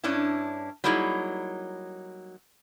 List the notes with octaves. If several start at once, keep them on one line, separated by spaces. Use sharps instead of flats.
G2 C#4 D4 E4
F#3 G3 A#3 D#4 E4 G#4